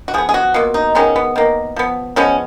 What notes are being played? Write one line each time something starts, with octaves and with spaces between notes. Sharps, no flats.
F#4
F3 B3 G#4
G#4
F#4
B2 A#3 F4
D#4
D#3 G#3 B3 C#4
B3
D#3 A#3
F3 B3
F3 G#3 B3 C#4